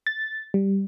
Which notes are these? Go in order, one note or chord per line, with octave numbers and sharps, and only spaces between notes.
A6
G3